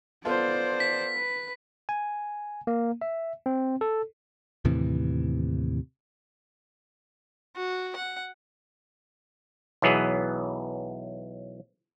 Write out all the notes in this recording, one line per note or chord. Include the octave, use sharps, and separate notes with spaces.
B3 F4 A4 C5 D5
B6
B4
G#5
A#3
E5
C4
A4
D#2 A2 C3 E3
F#4
F#5
B1 E3 F#3 B3 G#4